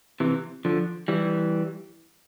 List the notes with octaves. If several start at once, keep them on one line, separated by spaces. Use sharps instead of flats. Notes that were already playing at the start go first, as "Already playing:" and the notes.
C3 E3
D3 F3
E3 G3